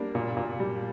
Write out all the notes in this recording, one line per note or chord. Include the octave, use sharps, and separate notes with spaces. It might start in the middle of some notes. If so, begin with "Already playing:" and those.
Already playing: G3 A#3 D4
A#2
A#2
G3